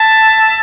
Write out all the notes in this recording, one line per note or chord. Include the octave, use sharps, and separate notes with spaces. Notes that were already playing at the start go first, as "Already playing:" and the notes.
Already playing: E5 A5